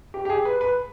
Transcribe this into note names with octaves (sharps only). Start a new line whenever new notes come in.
G4
G4
G#4
B4
B4